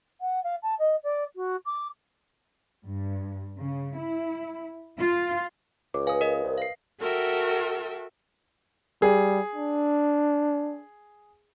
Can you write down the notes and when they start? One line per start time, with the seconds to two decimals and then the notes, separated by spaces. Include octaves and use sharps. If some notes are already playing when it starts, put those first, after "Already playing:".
0.20 F#5
0.43 F5
0.62 A5
0.79 D#5
1.03 D5
1.36 F#4
1.65 D6
2.84 G2
3.60 C#3
3.97 E4
4.98 F4
5.94 C#2 D6
6.07 B4 F5 G#5 D#6
6.21 A#4 D#5
6.44 C2
6.58 F5 C7
6.99 F#4 A4 A#4 E5 G5
9.02 G3 G#4
9.55 D4